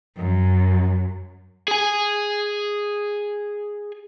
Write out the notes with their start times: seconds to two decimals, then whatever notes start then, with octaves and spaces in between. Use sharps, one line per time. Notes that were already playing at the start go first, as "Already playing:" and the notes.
0.17 F#2
1.68 G#4 G#5